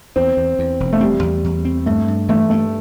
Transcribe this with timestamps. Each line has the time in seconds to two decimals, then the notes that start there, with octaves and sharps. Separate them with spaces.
0.16 E2 C4
0.37 E2
0.59 E2
0.80 E1
0.93 A3
1.01 G3 C4
1.23 E2
1.44 E2
1.65 C4
1.86 G2 A3
2.08 G2
2.29 E3 A3
2.50 G2 A3